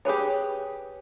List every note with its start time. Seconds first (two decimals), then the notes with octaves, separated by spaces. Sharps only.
0.05 G4 G#4 B4 C#5